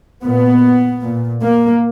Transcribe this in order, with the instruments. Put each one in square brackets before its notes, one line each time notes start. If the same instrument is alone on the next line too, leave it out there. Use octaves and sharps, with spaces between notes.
[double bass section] A#2 B3
A#2
A#3